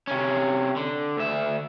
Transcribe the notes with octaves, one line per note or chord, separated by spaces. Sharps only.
C3 C#4
D3
D2 E5